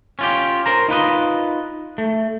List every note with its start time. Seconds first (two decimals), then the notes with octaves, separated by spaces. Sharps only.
0.19 C#4 F4 G4
0.66 A#4 C5 A#5
0.88 D#4 F4 B4 D#5
1.98 A3